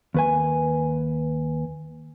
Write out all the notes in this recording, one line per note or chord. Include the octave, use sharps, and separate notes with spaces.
D#2 B4 G#5